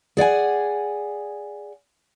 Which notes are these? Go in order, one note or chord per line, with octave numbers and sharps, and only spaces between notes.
G#4 D5 F#5 G#5